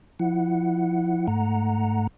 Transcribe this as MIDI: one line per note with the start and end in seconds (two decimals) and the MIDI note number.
0.20 1.27 53
0.20 1.27 64
0.20 1.27 78
1.28 2.07 44
1.28 2.07 57
1.28 2.07 78
1.28 2.07 82